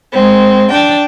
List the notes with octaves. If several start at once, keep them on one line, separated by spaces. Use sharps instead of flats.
G#3 C4
D4 G5